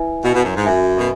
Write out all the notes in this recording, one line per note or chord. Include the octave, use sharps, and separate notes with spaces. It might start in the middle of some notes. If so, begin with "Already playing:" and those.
Already playing: E4 B4 E5 G#5
B2
B2
F#2
G#2
F#2 F#4 E5 G#5
B2